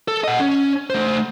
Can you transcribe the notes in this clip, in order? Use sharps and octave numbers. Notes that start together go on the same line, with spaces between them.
A4
D#5 F#5
C#4
A3 C5